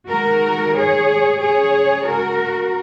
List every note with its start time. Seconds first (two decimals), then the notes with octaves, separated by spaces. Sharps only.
0.09 D#3 G#3 F#4 A#4
0.74 G#4 C#5
1.40 C#3 G#3 G#4 C#5
2.06 F#4 A#4